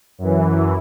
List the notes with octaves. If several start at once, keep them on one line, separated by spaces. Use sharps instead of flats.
F#2 E3